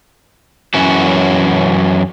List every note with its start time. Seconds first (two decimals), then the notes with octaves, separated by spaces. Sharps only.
0.74 F#2 E3 C#4 F#4